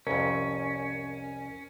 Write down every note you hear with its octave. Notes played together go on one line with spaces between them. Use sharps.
C2 F2 C#4 A#4